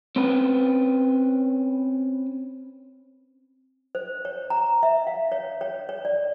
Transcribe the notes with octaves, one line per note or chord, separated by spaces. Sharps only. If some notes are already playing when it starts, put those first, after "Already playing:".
C4 C#4 B4
C5
C#5
A#5
E5
F5
C#5
C#5
C#5
D5